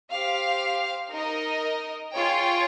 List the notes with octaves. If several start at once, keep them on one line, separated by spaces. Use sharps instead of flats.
G4 C5 F5
D#4 A#4 D#5
F4 G#4 C#5 G5